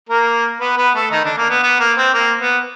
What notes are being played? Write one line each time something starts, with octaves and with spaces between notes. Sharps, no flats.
A#3 A#4
B3 B4
B3 B4
A3 A4
D#3 D#4
D3 D4
A#3
B3
B3
A#3
C4
A#3
B3